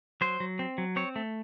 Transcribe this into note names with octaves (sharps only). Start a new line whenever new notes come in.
F#3 C5
F#3
C4
F#3
C4 C#5
A3